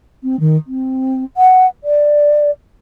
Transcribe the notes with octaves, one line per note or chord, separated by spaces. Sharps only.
C4
D#3
C4
F#5
D5